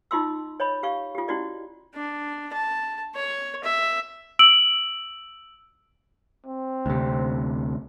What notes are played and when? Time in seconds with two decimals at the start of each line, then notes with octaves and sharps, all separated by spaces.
0.11 D#4 F4 D#5 C6 E6
0.60 C#5 D#5 B5
0.83 G4 F5 C#6
1.15 F4 G4
1.28 C#4 E4 F#4 G4 D5 D#5
1.94 D4
2.53 A5
3.15 C#5
3.63 E5
4.39 E6 D7 F#7
6.46 C4
6.86 D2 C3